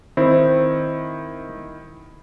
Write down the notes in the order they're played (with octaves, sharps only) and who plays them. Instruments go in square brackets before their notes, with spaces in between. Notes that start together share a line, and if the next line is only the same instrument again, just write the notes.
[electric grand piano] D#3 E4 [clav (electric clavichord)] C4